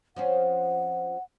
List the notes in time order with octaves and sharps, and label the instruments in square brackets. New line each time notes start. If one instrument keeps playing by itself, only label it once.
[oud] F3 C4 C#4 [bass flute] F#5